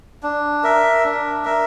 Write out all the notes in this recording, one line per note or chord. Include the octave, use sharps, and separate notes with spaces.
D4
A#4 E5
D4
A#4 E5